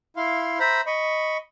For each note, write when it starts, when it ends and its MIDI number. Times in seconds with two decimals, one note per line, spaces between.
0.17 0.59 64
0.17 0.59 77
0.17 0.59 84
0.60 0.81 72
0.60 0.81 76
0.60 0.81 82
0.60 0.81 83
0.87 1.37 75
0.87 1.37 83
0.87 1.37 85